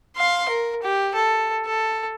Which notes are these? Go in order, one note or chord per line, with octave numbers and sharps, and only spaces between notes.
F5 C6
A#4
G4
A4
A4